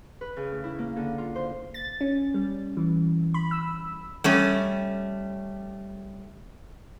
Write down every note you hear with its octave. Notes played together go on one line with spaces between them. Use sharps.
B4
C#3
A2
E4
A#3
D3
F4
C5
A6
C#4
G3
E3
B5
E6
G3 A3 C#4